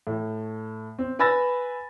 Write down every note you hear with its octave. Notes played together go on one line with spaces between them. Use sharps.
A2
C4
B4 G#5 B5 E6 A6 A#6